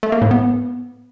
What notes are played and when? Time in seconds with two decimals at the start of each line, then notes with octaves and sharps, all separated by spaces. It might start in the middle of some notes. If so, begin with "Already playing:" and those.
0.03 A3
0.12 A#3
0.22 A2
0.31 B3